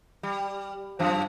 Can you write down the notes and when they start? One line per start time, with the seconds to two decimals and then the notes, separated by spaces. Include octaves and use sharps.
0.23 G3
0.99 F#2 F3 C4